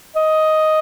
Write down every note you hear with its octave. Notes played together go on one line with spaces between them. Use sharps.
D#5